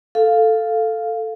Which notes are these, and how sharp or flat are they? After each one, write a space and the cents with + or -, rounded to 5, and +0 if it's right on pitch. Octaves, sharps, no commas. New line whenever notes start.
A4 +0 F5 +0